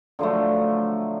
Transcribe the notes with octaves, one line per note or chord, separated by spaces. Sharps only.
D3 F3 F#3 A3